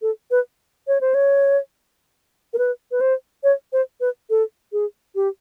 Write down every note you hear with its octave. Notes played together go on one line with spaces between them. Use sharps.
A4
B4
C#5
C5
C#5
A#4
B4
B4
C5
C#5
C5
B4
A4
G#4
G4